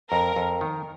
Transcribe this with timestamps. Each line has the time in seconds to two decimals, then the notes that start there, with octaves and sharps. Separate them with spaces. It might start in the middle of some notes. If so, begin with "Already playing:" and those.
0.11 F2 A#4
0.36 F2
0.61 D#3